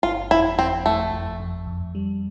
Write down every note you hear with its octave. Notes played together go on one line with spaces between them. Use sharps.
G1 F4
F2 E4
F2 C4
F2 A3
F2
F2
F2
G3